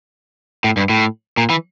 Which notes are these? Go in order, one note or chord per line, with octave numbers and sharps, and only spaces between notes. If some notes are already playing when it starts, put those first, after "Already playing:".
A2
G2
A2
A#2
E3